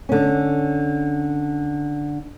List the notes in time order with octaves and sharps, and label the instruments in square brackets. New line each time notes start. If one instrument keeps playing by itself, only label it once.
[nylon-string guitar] D3 C#4